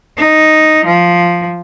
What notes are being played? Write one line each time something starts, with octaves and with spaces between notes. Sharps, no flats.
D#4
F3